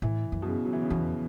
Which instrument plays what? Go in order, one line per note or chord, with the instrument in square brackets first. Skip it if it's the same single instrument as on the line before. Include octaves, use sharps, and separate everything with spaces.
[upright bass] A2 [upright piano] E3
[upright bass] F#2
[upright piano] B2
C#3
F#3
E3
C#3
[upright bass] E2 [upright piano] B2